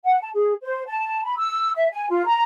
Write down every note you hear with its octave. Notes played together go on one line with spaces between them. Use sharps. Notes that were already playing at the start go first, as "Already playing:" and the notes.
F#5
A5
G#4
C5
A5
B5
E6
E5
G#5
F4
A#5